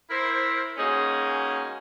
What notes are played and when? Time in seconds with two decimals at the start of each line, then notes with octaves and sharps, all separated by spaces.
0.10 E4 A#4 C5
0.77 G#3 A#3 C#4 D#4 F#4 G#4